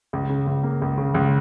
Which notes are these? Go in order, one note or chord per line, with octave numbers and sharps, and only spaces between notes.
C#2
C#3
C#2
A#3
C#2
C#3
C#2